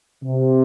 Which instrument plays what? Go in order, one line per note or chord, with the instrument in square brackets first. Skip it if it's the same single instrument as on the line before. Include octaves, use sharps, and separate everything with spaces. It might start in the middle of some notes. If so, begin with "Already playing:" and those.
[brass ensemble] C3